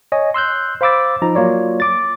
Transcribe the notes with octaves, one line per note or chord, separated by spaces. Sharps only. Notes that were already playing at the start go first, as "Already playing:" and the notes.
C#5 D#5 G#5
C6 E6 F#6 G6
C5 F5 B5 D6 E6 A6
F3 D#4 A#5
F#3 A#3 F4 C#5 D5
D6 A6